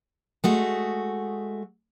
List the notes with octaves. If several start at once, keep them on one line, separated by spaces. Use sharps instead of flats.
G#3 A3 F#4